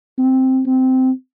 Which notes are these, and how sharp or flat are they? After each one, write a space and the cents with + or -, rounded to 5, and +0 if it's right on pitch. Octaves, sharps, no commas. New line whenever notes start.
C4 +0
C4 -15